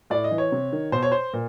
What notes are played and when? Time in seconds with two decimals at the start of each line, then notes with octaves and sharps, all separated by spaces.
0.10 A2 D5
0.24 D#5
0.31 E3
0.38 C#5
0.52 C3
0.72 D#3
0.92 B2 C5
1.02 C#5
1.12 C5
1.33 A#2